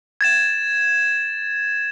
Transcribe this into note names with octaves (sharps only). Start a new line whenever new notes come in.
G#6 A6 E7